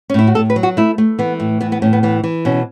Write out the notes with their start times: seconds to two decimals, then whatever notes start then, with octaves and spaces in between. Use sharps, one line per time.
0.10 C#4
0.14 A2 E4
0.27 F#4
0.35 A2 A4
0.50 B4
0.56 F#3
0.63 F#4
0.77 A3 E4
0.98 A3
1.19 E3 B3
1.40 A2
1.61 E3 B3
1.72 B3
1.82 A2 C#4
1.93 B3
2.03 E3 B3
2.23 E3
2.45 B2 C#4